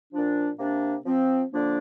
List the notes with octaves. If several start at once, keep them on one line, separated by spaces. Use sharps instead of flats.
A#2 F3 D4
C3 A#3 D4
F3 C4
D3 F3 A#3 D4